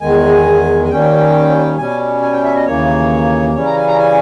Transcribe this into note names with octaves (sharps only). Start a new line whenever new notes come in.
E2 D#3 G#3 G#5
G#5
D#2 D#3 G3 C#4 G5
B2 G3 C#4 G#5
G#5
G5
E5
D#5
D#2 C#3 E3 A#3 C#5
C#3 E3 G3 C#4 C#5
A#5
G#5
A#5
G#5